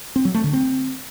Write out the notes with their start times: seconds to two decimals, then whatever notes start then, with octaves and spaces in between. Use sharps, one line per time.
0.16 C4
0.25 F#3
0.34 A3
0.44 D3
0.53 C4